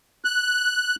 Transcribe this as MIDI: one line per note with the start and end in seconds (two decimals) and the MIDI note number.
0.25 0.96 90